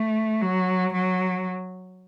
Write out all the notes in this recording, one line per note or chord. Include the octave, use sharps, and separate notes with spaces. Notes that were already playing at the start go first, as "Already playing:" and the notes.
Already playing: A3
F#3
F#3